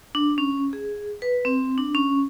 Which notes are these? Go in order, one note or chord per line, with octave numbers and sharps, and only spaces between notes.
D4
C#4
G#4
B4
C4
D4
C#4